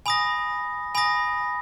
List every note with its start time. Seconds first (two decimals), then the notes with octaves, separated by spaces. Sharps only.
0.06 G#5 B5 D#6 A#6
0.95 G#5 B5 D#6 A#6